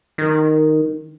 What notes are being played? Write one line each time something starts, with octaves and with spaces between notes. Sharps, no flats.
D#3